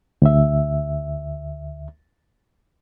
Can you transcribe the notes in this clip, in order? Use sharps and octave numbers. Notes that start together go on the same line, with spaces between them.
D2 E5